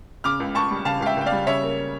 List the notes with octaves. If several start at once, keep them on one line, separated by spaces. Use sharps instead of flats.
C#3 D6 F6
C#2
C#2 A5 C#6
G3
C#3 F5 A5
C#2 F5
E5 G5
C#2 G5
D5 F5
G3
C#3 C#5 E5
A#3